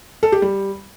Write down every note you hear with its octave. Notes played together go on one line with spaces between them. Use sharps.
A4
G4
G3